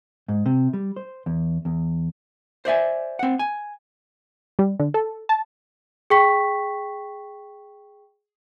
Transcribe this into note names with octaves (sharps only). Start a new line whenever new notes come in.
G#2
C3
G3
C5
E2
E2
C5 D5 E5 G#5
C4 F#5
G#5
G3
D3
A4
A5
G#4 G5 C#6 B6